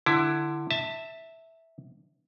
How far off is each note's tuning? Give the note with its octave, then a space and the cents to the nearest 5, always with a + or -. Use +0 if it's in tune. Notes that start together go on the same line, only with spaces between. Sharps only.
D3 +15 E4 +10
E5 -10 A5 +20